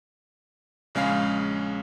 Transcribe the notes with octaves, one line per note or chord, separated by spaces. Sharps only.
A#1 C#3 G#3 C#4 F5 C7